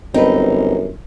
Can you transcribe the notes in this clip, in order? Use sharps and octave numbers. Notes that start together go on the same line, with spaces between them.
G1 F#2 C4 D#4 B4